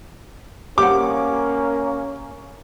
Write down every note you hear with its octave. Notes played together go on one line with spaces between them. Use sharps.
A#3 C#4 G4 F#5 D6